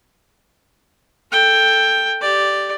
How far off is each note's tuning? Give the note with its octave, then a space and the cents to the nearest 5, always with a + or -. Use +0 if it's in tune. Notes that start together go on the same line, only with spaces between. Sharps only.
A4 +5 G5 +10
G4 +0 D5 +0